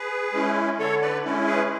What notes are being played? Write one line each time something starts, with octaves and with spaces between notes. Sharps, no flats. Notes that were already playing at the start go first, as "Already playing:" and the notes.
Already playing: G#4 B4
G#3 C#4 E4
D3 A4 C#5
B4 D5
G#3 C#4 E4
G#4 B4